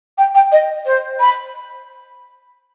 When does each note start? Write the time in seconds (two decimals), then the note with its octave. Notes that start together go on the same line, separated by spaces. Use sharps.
0.18 G5
0.35 G5
0.52 D#5
0.86 C5
1.20 B5